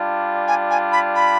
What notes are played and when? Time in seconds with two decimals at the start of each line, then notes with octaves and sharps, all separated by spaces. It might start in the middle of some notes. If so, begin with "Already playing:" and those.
Already playing: G3 D4 F4
0.48 G#5
0.70 G#5
0.92 B5
1.15 B5